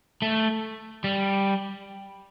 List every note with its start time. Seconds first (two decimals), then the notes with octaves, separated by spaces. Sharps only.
0.22 A3
1.04 G3